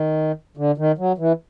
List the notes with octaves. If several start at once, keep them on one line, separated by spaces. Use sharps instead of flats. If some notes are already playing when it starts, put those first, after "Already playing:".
Already playing: D#3
D3
D#3
F#3
E3